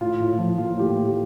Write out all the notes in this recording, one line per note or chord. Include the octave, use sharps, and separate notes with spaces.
A2 F4
A2
F3
A#3 F4
A2 G4